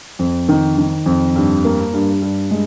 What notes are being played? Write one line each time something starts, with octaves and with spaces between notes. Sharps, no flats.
F2
D#3
D#3
F2
G2
A#3
G2
G2
G#3